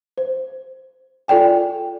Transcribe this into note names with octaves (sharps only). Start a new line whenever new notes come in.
C5
F4 A4 D5 G5 G#5